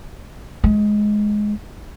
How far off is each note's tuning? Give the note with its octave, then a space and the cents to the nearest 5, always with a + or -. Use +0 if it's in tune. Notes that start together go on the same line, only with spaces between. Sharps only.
G#3 +10